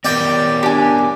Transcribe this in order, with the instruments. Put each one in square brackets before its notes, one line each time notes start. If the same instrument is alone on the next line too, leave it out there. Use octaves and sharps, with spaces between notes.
[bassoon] G3 [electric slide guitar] B3 A#4 C#5 [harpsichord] D5 G5
[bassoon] D4 [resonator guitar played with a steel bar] G4 G#5